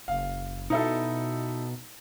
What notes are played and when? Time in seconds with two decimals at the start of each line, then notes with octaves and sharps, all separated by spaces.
0.08 F#1 F5
0.70 B2 D#4 E4 A4